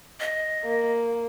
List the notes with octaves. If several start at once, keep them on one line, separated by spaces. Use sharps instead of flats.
D#5
A#3